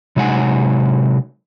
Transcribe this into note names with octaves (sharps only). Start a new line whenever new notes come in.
C3 F#3 G#3 D#4 F#5 G#5